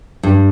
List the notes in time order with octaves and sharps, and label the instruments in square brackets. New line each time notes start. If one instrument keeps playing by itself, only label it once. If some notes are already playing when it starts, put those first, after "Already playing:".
[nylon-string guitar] G2